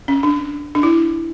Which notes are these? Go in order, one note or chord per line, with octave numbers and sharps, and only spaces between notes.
C#4
D4
D4
E4